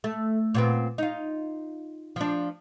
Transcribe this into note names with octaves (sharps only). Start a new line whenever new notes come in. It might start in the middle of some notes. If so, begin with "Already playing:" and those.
A3
A#2 B3 C4
D#4 F4
F3 D4